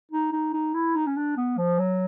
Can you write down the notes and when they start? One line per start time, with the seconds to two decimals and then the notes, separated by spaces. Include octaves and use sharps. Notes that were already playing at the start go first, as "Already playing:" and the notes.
0.11 D#4
0.33 D#4
0.53 D#4
0.74 E4
0.96 D#4
1.07 C#4
1.17 D4
1.37 B3
1.58 F3
1.79 F#3